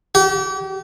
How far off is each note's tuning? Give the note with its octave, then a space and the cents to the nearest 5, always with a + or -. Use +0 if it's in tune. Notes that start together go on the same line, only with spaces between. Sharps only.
G4 -40